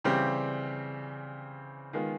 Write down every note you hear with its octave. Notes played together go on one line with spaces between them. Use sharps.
C#3 E3 G3 C4 G4
D#3 G#3 B3 F4